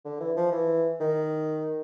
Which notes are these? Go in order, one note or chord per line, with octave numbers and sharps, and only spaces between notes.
D3
E3
F3
E3
D#3